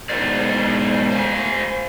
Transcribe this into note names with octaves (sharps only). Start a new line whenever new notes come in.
G#2 B2 A3 A#4 C5 D5
C5 F5 G#5